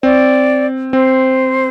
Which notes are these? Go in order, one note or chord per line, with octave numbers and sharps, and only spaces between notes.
C4 D5
C4 C5